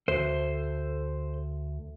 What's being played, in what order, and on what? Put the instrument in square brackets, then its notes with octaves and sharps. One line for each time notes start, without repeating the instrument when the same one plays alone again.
[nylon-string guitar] D2 [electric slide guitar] A4 C5